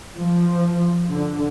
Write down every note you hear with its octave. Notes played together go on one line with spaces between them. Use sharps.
F3
D3